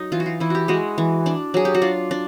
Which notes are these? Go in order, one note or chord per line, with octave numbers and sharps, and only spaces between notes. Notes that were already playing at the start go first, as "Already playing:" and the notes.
Already playing: F#3 D#4
E3 F4
F#4
F4
E3 E4
F#4 G4
G#3 F#4
E3
D4
F#3 G#4
G4
F#4
D4 F4
D4